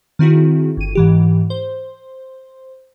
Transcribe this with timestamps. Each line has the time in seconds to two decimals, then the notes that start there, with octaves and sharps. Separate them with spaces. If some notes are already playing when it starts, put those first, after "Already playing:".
0.19 D#3 C4 E4 F#4 G#4
0.77 G1 D#7
0.95 G#2 E3 G4
1.50 C5